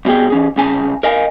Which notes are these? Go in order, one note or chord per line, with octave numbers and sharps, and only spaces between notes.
C2 B2 G3 G#4 G5
E3 C#4 G#4
C2 C#3 G#5 A5
A#4 D#5 F5 G#5